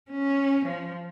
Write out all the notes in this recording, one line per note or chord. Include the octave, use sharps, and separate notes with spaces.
C#4
F3